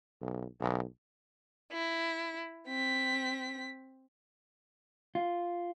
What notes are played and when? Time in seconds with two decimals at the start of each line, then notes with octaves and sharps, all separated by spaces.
0.21 B1
0.60 B1
1.72 E4
2.68 C4 B6
5.15 F4